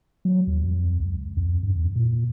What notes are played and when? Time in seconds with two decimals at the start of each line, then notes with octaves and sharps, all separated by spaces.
0.25 F#3
0.47 D#2
0.64 F2
1.00 C#2
1.37 F2
1.63 G2
1.75 E2
1.96 A#2